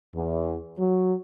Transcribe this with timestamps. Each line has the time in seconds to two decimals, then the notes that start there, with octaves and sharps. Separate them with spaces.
0.15 E2
0.78 F#3